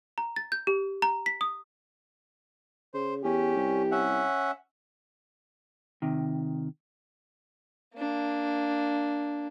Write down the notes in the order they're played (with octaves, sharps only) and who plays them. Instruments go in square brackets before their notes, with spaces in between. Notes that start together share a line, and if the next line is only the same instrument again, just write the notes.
[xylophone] A#5
A6
G6
G4
A#5
B6
D#6
[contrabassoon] C#3 [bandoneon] C5
[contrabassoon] E2 [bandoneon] C#4 [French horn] G4
[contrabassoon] C2
[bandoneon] C#4 E5 F#5
[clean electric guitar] C3 D#3
[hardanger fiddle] A#3 D4